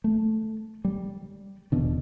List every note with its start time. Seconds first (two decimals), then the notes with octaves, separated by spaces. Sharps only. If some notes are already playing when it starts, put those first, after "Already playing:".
0.04 A3
0.85 G3
1.72 D#1 E2 B2 D3